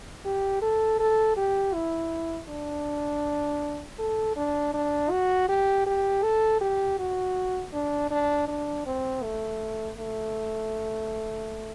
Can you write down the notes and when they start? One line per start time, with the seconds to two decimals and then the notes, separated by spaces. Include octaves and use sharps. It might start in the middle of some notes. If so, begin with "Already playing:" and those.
0.25 G4
0.62 A4
0.99 A4
1.37 G4
1.74 E4
2.49 D4
3.99 A4
4.36 D4
4.74 D4
5.11 F#4
5.49 G4
5.86 G4
6.23 A4
6.61 G4
6.99 F#4
7.74 D4
8.11 D4
8.48 D4
8.86 C4
9.23 A3
9.98 A3